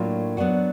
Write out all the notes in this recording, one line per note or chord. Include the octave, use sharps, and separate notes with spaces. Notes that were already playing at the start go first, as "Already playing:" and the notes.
Already playing: A2 F#3 A#3 D4 F4
F#3 B3 D4 F#4